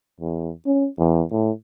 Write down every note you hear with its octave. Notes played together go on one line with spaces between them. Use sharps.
E2
C#4
E2
A2